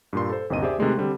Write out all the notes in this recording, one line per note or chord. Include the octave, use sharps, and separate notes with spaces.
G2 A#2 C6
A4 C5
G1 D#2 C3 D#5 D#7
G4 G#4 C5 D5 E5
C3 D#3 G#3 A3
D3 G3 C4